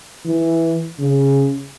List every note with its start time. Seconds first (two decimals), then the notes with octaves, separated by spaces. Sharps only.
0.26 E3
0.99 C#3